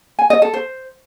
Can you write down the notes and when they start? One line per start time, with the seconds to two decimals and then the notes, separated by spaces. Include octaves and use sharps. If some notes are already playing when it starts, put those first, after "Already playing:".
0.19 G#5
0.30 D#5
0.42 A4
0.54 C5